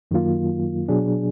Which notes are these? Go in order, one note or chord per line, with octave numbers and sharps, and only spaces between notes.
F#2 D#3 F#3 A#3 F4
B2 F#3 D4 G#4